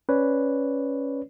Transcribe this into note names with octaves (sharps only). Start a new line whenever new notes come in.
C#4 B4 C#5 D5